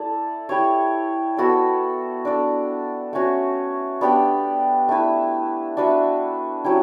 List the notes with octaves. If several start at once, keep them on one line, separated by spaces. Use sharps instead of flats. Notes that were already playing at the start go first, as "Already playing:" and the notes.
Already playing: E4 A4 D5
E4 G4 C#5
B3 F#4 A4 D5
D4 A4 D5
A3 C#4 F#4
B3 D4 G4 D5
A3 E4 B4
D4 F#4 B4 E5
F#3 C#4 E4 G4